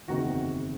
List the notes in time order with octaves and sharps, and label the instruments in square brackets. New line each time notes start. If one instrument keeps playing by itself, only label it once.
[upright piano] F#1 E2 C3 D#3 F#4